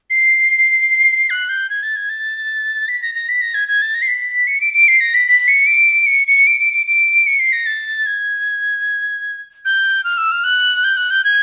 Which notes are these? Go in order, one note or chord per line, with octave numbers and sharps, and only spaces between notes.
C7
F#6
G6
G#6
A6
G#6
A6
B6
A#6
A#6
B6
A#6
G#6
G#6
A6
A#6
C7
B6
C#7
D7
D7
C7
A#6
B6
B6
C#7
D7
C#7
C#7
D7
D7
D7
D7
C#7
C7
A#6
A6
G#6
G6
F6
E6
F6
F#6
G6
F#6
G6
G#6